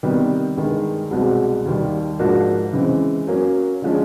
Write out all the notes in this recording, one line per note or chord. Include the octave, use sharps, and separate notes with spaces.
C3 D#3 G3 B3
G2 D#3 G#3
C2 B2 G#3 C4
D#2 D#3 G3
G#2 F3 A#3 D4 F#4
C#3 E3 G#3 C4
F#3 A#3 C#4
D3 F3 G#3 C#4